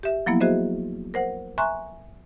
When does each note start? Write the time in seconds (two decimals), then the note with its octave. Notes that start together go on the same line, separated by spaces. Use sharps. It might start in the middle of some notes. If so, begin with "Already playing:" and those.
0.03 G4 E5
0.26 F3 F#3 A#3 B3 E4
0.40 F#4 G#4 C5 D#5 E5
1.14 A#4 C5 F#5
1.58 E5 G#5 A#5 C6 C#6 F#6